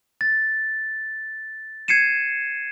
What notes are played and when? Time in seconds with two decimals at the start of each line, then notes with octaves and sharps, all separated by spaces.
0.21 A6
1.88 G#6 C7 C#7 D#7 E7